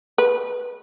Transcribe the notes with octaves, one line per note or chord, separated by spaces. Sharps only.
B4